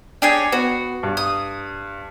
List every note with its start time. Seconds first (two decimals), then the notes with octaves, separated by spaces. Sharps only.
0.22 D4 G4 G#4 C#5
0.52 B3 F#4
1.03 G2
1.17 D#6